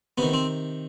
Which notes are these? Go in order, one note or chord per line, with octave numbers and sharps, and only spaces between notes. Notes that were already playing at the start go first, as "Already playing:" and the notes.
C3 D#3 B3
C4